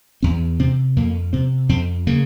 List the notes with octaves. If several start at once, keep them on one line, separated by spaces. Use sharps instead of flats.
E2 C4
C3 C4
F2 A#3
C3 C4
F2 C4
C#3 A#3